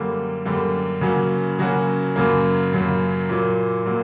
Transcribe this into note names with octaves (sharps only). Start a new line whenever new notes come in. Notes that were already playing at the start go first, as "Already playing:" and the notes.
Already playing: F#2 D3 G3 A#3
F#2 D3 G3 A#3
C#3 F#3 A#3 C#4 F#4
C#3 F#3 A#3 C#4 F#4
F#2 C#3 F#3 A#3
F#2 C#3 F#3 A#3
A#2 F#3 A#3
A#2 F#3 A#3